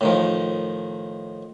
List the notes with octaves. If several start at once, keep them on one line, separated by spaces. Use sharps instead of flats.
A2 D#3 F3